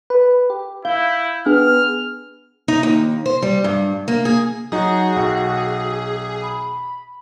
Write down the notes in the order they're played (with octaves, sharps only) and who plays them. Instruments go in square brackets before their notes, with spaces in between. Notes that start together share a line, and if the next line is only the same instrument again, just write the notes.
[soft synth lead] B4
G4
[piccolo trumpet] E4 [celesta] F5 [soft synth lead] G6
[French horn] B3 [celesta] D4 [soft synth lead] G#4 [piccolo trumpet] F6
[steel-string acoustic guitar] D#4
D#2
C5
G3
G2
A#3
G#4
[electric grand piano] F#3 D#4 [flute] F#4 [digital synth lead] G#4
[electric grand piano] B1
[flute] B5